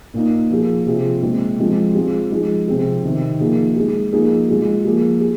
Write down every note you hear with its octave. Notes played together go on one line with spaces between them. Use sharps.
A#2 A#3 D#4
F3 A#3 F4 G#4
C3 F3 C4 F4 G#4
A#2 G#3 C4
F3 G#3 C4
G#3 C4 F4 G#4
F3 G#3 D#4 G#4
C3 F3 C4 G#4
C3 D#3 C4
F3 A#3 D#4 G#4
G#3 D#4 G#4
F3 A#3 D#4 G#4
G#3 F4 G#4
F3 A#3 G#4
G#4